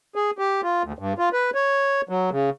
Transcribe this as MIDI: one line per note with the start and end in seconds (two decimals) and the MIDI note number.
0.16 0.31 68
0.38 0.61 67
0.63 0.83 65
0.83 0.92 38
0.99 1.13 43
1.18 1.29 65
1.33 1.50 71
1.55 2.01 73
2.09 2.30 54
2.32 2.50 49